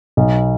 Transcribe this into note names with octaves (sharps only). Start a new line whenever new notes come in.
B1